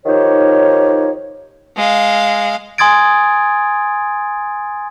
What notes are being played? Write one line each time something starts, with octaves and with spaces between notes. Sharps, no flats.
D#3 F3 D#4 G4 C#5
G#3 F5
G#5 C6 D#6 G#6 A6 D7